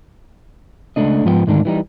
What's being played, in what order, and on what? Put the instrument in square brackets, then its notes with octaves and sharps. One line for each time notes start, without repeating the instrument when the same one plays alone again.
[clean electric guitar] C#2 A3 D4 D#5
G#2 F3 B3 D#5 G5
D2 G#2 D3 D#3 D4
E3 G3 D#4